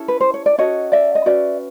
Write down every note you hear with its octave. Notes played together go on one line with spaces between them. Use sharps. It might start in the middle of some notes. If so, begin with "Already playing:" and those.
Already playing: C#4 E4 A4
B4
C5
C#5
D5
C#4 F#4 A4 C#5 D#5
D5 E5
D#5
C#4 F#4 B4 D5 E5